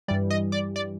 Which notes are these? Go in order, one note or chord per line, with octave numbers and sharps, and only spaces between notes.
G2 E3 G3 D5
D#5
D5
D5